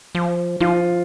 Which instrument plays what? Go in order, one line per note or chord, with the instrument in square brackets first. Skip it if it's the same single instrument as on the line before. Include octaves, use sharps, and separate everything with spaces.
[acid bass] F3
[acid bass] F3 [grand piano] F4